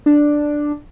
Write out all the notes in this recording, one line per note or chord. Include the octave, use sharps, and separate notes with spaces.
D4